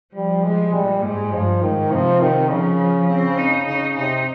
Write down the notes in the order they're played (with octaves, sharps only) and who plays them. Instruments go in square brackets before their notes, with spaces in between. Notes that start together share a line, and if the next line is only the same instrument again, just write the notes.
[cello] F3 [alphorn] G3
[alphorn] G#3
[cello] A#2 [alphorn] G3
[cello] G#2 [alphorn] G#3
[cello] G2 [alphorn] F3
[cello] G#2 [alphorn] D#3
[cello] C3 [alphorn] F3
[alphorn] D#3
[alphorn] C#3 [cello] F3
[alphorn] C#3 [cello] C4
[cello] D#4
[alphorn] C#3 [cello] D#4
[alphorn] C3 [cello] D#4